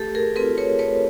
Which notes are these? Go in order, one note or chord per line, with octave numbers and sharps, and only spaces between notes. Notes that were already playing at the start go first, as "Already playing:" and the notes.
Already playing: A3 G4 A4
G#4 A#4
C4 F4 A4 B4
B4 C#5
A3 B4 C#5